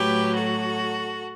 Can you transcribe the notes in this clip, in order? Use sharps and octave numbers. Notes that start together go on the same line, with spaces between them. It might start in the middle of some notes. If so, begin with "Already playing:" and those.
Already playing: A2 F#3 G4 B4
F#4 A4